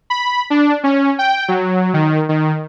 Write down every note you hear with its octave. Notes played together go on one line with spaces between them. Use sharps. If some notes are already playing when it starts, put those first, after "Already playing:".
B5
D4
C#4
G5
F#3
D#3
D#3